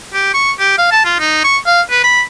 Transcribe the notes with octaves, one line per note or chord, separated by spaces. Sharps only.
G4
C#6
G4
F5
A5
F4
D#4
C#6
F5
B4
B5